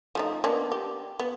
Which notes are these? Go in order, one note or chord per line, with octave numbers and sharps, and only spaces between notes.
F3 A3 D#4
A#3 B3 D4
G4
B3